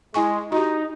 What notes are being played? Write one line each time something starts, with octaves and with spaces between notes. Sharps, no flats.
G#3 E4 G#5 C#6
D#4 F#4 G4